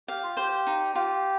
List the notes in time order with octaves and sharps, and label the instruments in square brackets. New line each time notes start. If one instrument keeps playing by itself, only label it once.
[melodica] G4 [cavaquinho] F5
[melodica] F4
[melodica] G4 [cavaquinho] C5
[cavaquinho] D#4
[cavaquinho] F4 [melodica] G4